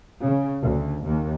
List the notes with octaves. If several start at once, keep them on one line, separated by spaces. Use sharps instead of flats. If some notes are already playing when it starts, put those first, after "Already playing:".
C#3
D2
D#2